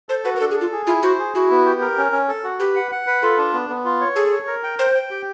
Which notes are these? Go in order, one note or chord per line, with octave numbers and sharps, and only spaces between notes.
A4 C5
F#4 B4
A#4
D4 A4
G#4
F4 A4
G#4
E4 F4
F#4 C5
G#4
E4 F#4
B3
G4
A#4
C#4
C#4
A4
F#4
G4 B4
F#5
F#5
B4
F4 A4
D4
B3
B3
F4
C#5
G#4 A4
C#5
A#4
G5
C5 G5
G5
G4